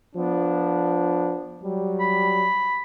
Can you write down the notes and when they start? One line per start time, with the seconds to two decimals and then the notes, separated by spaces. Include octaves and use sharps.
0.15 F3 B3 D4
1.61 F#3 G3
2.00 B5